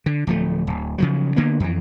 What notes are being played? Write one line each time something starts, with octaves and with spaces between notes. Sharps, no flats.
D3
D1 F3 A3
D1
C#3 F3 F#3
D3 A#3 B3
F2 E3